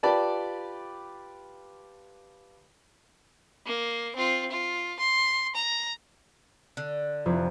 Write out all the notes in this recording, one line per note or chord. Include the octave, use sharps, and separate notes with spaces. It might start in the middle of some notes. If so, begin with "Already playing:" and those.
F4 G4 B4 D5 A5 B5
A#3
C4 F4
F4
C6
A#5
D3
F1 F2